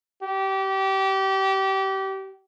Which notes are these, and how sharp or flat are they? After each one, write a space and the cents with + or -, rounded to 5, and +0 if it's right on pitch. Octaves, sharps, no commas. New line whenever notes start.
G4 -25